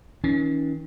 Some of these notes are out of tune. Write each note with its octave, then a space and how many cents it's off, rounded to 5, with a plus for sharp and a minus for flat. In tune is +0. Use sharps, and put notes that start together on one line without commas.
D#3 +45 C#4 +15